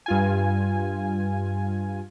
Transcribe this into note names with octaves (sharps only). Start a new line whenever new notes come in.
G2 F4 G#5